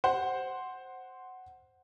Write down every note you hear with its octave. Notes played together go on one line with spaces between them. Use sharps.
C5 F#5